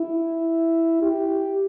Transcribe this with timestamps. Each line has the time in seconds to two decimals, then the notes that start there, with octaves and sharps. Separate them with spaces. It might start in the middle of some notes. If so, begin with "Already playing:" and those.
Already playing: E4
1.02 G4